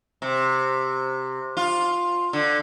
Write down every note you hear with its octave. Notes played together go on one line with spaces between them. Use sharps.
C3
F4
D3